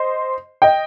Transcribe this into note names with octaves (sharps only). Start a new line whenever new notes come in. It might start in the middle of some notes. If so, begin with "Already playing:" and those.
Already playing: C5 D#5
D#5 G5